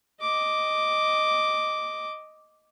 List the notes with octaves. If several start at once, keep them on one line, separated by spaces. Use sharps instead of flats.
D#5 D6